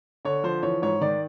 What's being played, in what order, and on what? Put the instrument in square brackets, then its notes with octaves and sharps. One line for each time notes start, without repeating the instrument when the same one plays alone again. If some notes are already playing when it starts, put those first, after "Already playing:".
[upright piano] D3 C#5
F3 C5
E3 C#5
G#2 C#5
D#3 D5